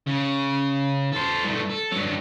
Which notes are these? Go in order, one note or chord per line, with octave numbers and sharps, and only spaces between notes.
C#3
A4 C5
G2 A3
A4
G2 F#3